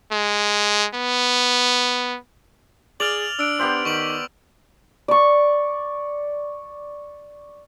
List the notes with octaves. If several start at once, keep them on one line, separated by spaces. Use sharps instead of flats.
G#3
B3
G#4 D5 F6 F7 F#7
D4 E6 D7
B3 G4 C5
D#3 C#6 D6 F#7
D5 C#6